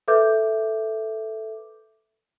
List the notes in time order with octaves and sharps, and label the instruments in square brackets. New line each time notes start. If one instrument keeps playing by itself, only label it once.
[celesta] A4 B4 E5 D6 G6